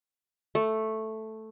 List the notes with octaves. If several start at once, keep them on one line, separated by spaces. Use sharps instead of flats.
A3